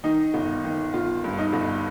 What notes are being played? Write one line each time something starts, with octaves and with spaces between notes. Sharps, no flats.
D#3 D#4
G1
D#3
G1 F4
G2
D#4
G1